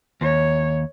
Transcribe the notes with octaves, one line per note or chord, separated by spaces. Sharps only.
D#2 C#5